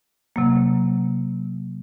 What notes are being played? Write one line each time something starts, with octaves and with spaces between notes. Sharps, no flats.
C3 F#3 A#3